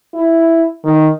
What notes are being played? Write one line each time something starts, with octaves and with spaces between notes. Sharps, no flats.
E4
D#3